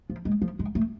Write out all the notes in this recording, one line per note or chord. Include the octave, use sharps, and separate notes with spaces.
F3
G#3
F3
G#3
A3